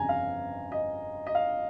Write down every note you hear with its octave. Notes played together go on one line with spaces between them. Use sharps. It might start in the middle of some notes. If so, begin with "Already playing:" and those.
Already playing: G1 F2 C#3 G#5 A#5
F5
D#5
D#5
F5